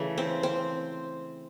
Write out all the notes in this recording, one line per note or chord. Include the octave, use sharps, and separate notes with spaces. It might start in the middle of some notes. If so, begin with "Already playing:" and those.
Already playing: C#3 E3 A3
C4
C4